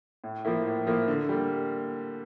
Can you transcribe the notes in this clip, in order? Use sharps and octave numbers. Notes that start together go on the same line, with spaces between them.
A2
F3 A#3 E4
A2
F3 A#3 E4
D3
G3 A#3